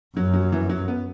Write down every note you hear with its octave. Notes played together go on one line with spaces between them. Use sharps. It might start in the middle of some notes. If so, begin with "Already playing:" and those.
F#2 F#3
F#3
E3
F#3
B3